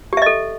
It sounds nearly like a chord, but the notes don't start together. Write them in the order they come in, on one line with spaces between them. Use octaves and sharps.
G4 E5 D#5 A4